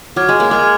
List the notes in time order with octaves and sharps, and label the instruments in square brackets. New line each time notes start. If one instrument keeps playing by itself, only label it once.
[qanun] F#3 [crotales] D6 F6 G#6
[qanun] G#3
A#3
[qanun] G#3 [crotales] D6 F6 G#6